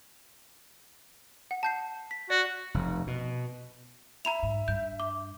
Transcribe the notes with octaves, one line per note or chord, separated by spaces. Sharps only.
F#5
A5 G6 C7
B6
F#4 D5
F1
B2
E5 A#5 B5 F7
G#2
G2 G6
D6